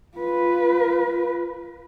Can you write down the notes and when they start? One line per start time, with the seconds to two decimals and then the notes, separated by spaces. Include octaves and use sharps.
0.17 F4 B4